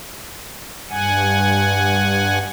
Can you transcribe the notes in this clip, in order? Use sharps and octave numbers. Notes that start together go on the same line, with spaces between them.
G2 F#5 G#5